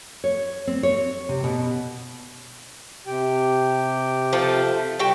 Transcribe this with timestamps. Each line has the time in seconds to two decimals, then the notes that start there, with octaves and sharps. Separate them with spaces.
0.24 C#5
0.67 C4
0.83 C#5
1.29 C3
1.44 B2
3.07 C3 G4 G5
4.33 F3 A3
4.99 G3 F#4 G4 G5